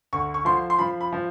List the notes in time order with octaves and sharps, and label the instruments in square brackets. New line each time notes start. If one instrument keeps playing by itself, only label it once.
[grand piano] D2 C#6
C#6
F3 C6
C6
F3 B5
B5
F3